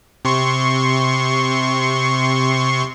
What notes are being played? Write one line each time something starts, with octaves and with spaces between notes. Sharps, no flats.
C3 C6 C#6